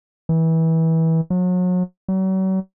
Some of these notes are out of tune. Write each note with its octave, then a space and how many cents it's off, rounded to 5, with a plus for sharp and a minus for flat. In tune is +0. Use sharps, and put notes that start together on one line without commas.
E3 -25
F#3 -35
F#3 +40